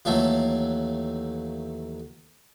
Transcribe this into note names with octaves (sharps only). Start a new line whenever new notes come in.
D#2 E3 F#3 A3 F4